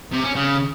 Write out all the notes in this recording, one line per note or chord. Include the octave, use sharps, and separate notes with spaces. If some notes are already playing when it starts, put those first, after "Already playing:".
C3
C#4
C#3